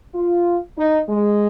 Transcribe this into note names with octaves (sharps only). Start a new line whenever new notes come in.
F4
D#4
G#3